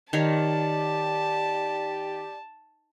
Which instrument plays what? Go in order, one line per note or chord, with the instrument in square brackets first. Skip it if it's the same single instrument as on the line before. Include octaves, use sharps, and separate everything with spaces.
[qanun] D#3 C#5 F5 [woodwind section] G4 D5 [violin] A5